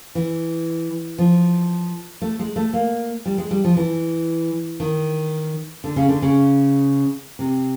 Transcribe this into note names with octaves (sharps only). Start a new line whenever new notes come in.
E3
F3
A3
G#3
A3
A#3
G3
G#3
G3
F3
E3
D#3
D3
C#3
D3
C#3
C3